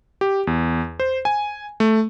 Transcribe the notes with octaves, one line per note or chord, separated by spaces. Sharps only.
G4
E2
C5
G#5
A3